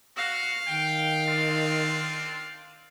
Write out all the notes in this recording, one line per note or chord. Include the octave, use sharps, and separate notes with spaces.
F#4 F5
D#3 G5
C4 D4 F4